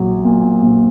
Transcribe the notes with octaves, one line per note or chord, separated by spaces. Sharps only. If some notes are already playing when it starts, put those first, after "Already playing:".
Already playing: A#1 F#3
A#2
A#1